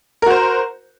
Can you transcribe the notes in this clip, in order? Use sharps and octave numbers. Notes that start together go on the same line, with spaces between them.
F#4 A#4 C5